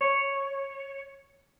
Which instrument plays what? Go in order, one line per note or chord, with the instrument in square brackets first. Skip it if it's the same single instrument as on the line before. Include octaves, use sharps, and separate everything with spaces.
[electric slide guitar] C#5